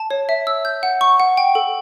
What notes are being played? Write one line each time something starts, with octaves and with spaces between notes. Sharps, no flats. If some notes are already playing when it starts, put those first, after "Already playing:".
Already playing: A5
C#5
E5
E6
G6
F#5
C#6
F#5
G5
A4